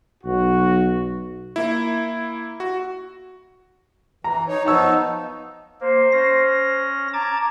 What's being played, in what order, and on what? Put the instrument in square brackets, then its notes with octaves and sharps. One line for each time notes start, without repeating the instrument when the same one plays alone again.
[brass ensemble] B1 F#4
[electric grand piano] A#3 E4
F#4
[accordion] E3 [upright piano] A#5
[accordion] D#4 C#5
[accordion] F3 B3 D#4 [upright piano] A5 C#6 E6
[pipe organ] A#3 [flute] C5
[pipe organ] C#4 A#6
[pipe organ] A5 D6 G#6 [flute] A#5